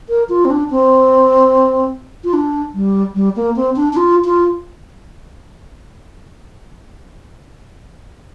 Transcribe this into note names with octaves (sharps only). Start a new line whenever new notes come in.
A#4
F4
C4
D4
C4
F4
D4
G3
G3
A#3
C4
D4
D4
F4
F4